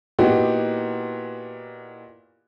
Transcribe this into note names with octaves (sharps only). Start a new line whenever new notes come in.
A#2 E3 B3 D#4 F#4 G4